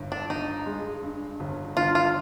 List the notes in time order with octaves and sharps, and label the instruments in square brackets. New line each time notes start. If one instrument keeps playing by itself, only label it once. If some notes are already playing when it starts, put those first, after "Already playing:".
Already playing: [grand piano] G1 G2
[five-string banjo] D4
[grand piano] D3 [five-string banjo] D#4
[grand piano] G#3
G2
G1
[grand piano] D3 [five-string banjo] F4
[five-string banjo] F4